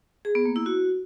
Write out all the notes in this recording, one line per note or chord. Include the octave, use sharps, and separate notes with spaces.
G#4
B3
A#3
E4
F#4